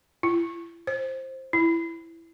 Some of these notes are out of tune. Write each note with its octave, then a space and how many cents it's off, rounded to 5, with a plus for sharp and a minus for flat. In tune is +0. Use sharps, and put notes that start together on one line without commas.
E4 +40
C5 +15
E4 +10